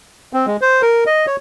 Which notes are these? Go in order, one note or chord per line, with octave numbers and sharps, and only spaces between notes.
C4
G#3
C5
A#4
D#5
C#5